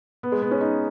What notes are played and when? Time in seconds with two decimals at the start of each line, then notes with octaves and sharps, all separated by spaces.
0.23 B3
0.32 G#3
0.42 B3
0.51 C#4
0.61 D#4